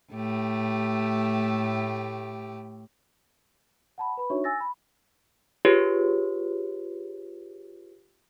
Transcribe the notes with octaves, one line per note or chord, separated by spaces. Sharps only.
A2 A3 G4
F#5 A5 B5
B4 B5
D4 D#4 F#4 C#5 E5 C#6
G#5 E6 A6 A#6
B5
F4 G4 G#4 B4 C#5